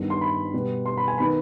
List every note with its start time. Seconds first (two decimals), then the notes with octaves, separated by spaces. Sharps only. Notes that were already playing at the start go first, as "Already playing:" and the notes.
Already playing: G2 D#3 G3 B3
0.10 C6
0.21 B5
0.53 B2 G3 B3
0.86 C6
0.97 B5
1.08 G#5
1.18 D#3 B3 B5